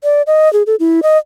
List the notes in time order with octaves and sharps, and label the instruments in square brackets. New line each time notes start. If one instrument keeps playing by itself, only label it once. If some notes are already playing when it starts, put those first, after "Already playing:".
[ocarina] D5
D#5
G#4
A4
E4
D#5